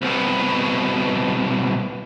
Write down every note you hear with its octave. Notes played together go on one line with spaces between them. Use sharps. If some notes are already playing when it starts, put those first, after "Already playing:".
C2 B2